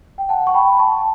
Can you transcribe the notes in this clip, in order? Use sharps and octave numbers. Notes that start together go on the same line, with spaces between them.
G5
F#5 A5
C#6
G5 B5
A5 C#6